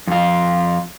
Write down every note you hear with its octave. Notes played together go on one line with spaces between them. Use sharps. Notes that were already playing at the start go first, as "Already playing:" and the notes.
F2 F4